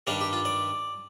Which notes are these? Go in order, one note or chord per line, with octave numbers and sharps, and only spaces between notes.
G2 D#3 G3 D4 F5
G4
F4
D5